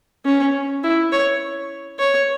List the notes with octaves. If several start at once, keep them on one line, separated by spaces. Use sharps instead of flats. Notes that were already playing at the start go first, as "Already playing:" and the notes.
C#4
E4
C#5
C#5